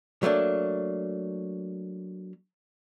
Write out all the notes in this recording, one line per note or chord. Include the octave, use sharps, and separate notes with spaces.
F#3 A3 A#3 D4